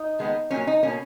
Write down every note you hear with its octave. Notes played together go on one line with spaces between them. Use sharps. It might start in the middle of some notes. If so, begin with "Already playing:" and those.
Already playing: D#4
D#3 G#3 B3
A#2 F#3 A#3 C#4
D#4
B2 A#3 C#4